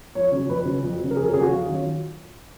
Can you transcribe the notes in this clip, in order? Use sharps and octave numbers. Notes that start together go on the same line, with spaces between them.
F2 C#5
C#3 F#3
F2 B4
C#3 F#3
F2
F#3
C#3
A#4
F2 G#4
A#4
C#3 F#3 G#4
F#4
F2 F4
D#3 F#3 C#4